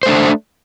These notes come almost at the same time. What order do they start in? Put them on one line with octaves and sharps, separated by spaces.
C5 A3 D4